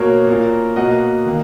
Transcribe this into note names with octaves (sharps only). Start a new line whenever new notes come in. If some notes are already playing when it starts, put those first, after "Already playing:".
Already playing: B2 A#3 A#4 C#5
A#2
A#3
B2 A#3 D#5 F#5
D#3 A#3